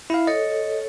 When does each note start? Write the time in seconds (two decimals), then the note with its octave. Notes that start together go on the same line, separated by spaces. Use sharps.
0.10 E4 E5 F5
0.27 A4 C#5 D#5